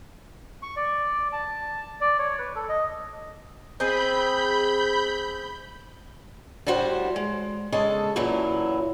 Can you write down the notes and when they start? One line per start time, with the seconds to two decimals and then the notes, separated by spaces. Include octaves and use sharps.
0.62 C#6
0.77 D5
1.33 A5
2.01 D5
2.19 C#5
2.39 B4
2.56 A4
2.69 D#5
3.80 C4 G#4 D#5 B5 G6
6.67 A2 G3 F#4 C5 F#5
7.16 G#3
7.72 C#3 G#3 G#4 A4 A5
8.16 F#2 A#2 E3 F#3 E4